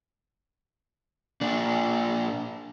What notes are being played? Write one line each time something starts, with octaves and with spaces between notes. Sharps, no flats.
A#2 D4